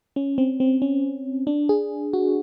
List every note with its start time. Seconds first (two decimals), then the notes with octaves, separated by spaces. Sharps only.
0.16 C#4
0.38 C4
0.60 C4
0.82 C#4
1.47 D4
1.69 G#4
2.13 F#4